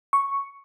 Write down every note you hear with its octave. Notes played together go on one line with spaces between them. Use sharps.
C#6